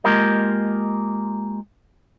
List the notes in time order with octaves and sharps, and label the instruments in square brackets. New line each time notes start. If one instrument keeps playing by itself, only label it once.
[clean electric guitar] G#3 A#3 F4 G4 A#4 D#5